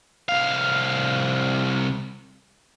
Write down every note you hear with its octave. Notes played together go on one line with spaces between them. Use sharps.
C2 F5